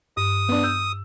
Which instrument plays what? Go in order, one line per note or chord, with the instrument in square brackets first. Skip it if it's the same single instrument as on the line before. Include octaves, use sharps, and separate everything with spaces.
[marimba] G2 [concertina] D#6
[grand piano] B3 D4
[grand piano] E6 [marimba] G6